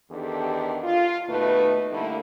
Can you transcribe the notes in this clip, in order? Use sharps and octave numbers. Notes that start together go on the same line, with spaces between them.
E2 D#3 D4 G4 A4
F4
D#2 B2 A3 D#4 B4
D3 G3 A3 A#3 E4